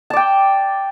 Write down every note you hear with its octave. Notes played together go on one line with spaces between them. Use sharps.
D5 G5 A5